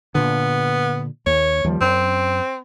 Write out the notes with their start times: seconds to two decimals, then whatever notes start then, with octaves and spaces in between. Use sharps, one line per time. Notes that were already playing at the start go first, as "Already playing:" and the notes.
0.15 A#2 D3 B3
1.26 D#2 C#5
1.64 D#2 F3 G3
1.81 F#2 C4